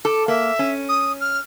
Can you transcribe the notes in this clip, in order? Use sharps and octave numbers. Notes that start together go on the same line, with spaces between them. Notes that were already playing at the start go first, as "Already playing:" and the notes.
A4 D6
A#3 E5
C#4
D#6
F6